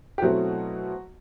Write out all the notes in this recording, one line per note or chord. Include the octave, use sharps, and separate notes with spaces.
G4
B2 F#3 A3 C4 E4 F#4